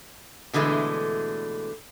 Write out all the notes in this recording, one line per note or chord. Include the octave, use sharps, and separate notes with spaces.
B2 D3 E3 G#3 A3